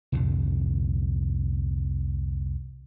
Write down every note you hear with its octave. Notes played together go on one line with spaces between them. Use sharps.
C2 F2 A#2 D3